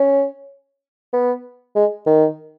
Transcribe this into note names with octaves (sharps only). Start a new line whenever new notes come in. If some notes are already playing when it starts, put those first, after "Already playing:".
Already playing: C#4
B3
G#3
D#3